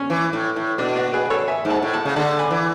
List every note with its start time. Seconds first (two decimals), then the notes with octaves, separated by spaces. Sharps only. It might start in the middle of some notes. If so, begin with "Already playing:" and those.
Already playing: C#4 D4
0.10 E3
0.33 A2
0.56 A2
0.78 B2 D4
0.96 D4 F#4
1.13 G#4 B4
1.30 A4 C#5
1.48 E5 G#5
1.65 G#2
1.70 F#5 A5
1.82 A2
1.94 F#5 A5
2.05 C#3
2.16 D3 F#5 A5
2.39 G#5 B5
2.51 E3